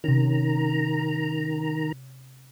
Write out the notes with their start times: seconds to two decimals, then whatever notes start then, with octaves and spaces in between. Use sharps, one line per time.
0.04 C3 D#3 C#4 A#5